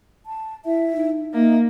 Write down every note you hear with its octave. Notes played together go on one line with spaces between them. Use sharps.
A5
E4 E5
D#4
A#3 D#4 E5